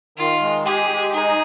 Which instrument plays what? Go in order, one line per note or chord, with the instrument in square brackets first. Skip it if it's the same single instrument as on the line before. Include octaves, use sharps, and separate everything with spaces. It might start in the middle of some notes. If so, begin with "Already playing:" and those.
[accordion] D#3 [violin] F4
[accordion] G#3
[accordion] G4 [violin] G#4
[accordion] G#3
[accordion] D#4 [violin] G#4